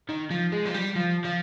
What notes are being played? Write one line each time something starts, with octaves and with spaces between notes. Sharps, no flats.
D#3
F3
G#3
F3
G3
F3
F3